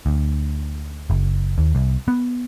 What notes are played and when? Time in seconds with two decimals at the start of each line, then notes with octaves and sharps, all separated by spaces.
0.06 D2
1.10 F#1
1.58 D#2
1.75 C2
2.08 B3